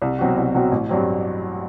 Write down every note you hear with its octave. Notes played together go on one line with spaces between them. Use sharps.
C2
B2 F#3 C4 F#4
C2
B2 F#3 C4 F#4
A1
G2 F#3 C4